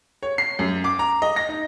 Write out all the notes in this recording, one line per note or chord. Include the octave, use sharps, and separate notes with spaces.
C#5
C7
F#2
D6
A#5
D#5
A#6
D#4